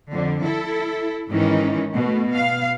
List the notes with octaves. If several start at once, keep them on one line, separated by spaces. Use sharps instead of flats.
F2 D3
E4 A4
G#2 D#3 E3 C#4 D#4
B2 A3
B3 F5